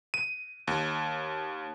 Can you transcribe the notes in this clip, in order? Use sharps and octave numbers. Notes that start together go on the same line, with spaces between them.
D#7
D#2